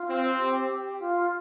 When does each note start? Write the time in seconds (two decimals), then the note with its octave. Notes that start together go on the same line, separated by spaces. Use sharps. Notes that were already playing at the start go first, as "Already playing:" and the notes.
Already playing: F4
0.09 C4
0.39 G4
1.00 F4